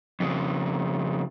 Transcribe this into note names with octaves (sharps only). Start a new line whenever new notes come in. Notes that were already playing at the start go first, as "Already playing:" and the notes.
F2 C#3